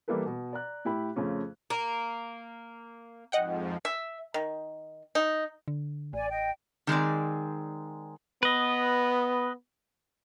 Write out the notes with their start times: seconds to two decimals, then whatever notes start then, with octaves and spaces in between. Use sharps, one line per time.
0.08 E3 G3 A#3 E4 A4 B4
0.26 B2
0.53 D5 A#5 F#6
0.85 A2 E4 G4 B5
1.16 F2 C#3 A3 C#4 F4
1.70 A#3
3.32 F2 G#2 F3 D#5 F#5 G5
3.85 E5
4.34 D#3
5.15 D#4
5.68 D3
6.13 A1 D5 G#5
6.30 D#5 G5
6.87 D#3 G#3 C4 D5
8.43 B3 B4 D#5